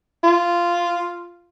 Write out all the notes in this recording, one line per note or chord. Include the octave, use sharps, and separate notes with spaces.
F4